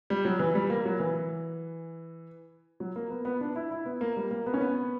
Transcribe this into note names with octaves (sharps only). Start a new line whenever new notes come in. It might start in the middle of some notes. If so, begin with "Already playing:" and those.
G3
F#3
E3
G3
A#3
F#3
E3
F#3
A#3
B3
B3
D4
E4
E4
B3
A#3
G3
A#3
B3
C#4
B3